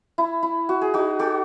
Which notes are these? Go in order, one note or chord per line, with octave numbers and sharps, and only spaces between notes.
E4
E4
F#4
G#4
D#4 F#4
F#4 A4